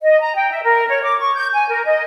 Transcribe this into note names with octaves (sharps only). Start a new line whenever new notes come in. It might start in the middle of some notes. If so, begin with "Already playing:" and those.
D#5
A#5
G5
E5
A#4
C#5
D6
C#6
G6
G#5
A#4
D#5